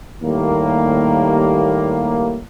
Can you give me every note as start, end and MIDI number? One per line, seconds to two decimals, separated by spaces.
0.23 2.41 39
0.23 2.41 45
0.23 2.41 55
0.23 2.41 58